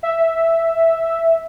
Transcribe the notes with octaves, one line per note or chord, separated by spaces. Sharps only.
E5